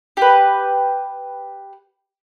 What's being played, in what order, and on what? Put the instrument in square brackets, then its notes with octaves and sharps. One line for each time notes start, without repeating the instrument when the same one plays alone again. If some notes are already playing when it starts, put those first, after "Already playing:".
[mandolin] G4 B4